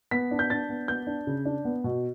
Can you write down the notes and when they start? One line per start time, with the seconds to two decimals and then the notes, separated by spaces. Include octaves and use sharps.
0.11 B3 B6
0.31 D4
0.39 G6
0.50 D4 A6
0.69 B3
0.88 B3 G6
1.07 D4
1.27 C#3
1.45 D4
1.65 B3
1.84 B2